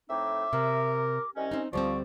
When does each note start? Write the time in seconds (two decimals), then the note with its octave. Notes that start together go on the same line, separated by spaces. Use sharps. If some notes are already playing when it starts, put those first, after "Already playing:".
0.10 A2 C4 D#4 E5 D6
0.53 C3 A#4
1.36 C2 C#4 D#5
1.51 C4 D#4
1.73 D2 F3 G3 C4 D5 C#6